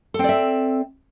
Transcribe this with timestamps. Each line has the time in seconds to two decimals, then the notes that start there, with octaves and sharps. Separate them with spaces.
0.14 A4
0.19 C4
0.24 D5
0.29 E5